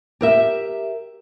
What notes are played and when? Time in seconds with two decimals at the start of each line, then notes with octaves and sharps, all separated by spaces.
0.21 G4 A#4 E5